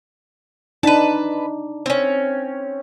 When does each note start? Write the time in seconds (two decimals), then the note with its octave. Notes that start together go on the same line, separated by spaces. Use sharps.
0.83 D4 D#4 B4 A5
1.86 C4 C#4